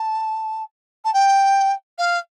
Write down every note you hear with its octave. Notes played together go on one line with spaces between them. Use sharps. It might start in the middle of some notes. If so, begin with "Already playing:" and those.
Already playing: A5
A5
G5
F5